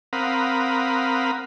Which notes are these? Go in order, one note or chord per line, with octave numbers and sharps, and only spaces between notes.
C4 A#4 F5 F#5 B5 D#6